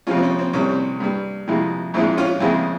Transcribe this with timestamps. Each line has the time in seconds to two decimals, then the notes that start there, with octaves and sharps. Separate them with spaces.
0.07 F2 C3 F3 G#3 C#4 F4
0.17 C4
0.23 C#4
0.38 C4
0.53 C2 C3 G3 C#4
0.69 C4
1.00 G2 G3
1.48 F2 C3 E3 G#3
1.94 A#1 G#2 F3 G#3 C4 E4
2.18 C#4 F4
2.40 F2 C#3 E3 G#3 C4 E4